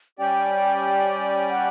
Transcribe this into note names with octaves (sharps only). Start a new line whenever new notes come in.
G3 C#4 G4 D5 G5
F#5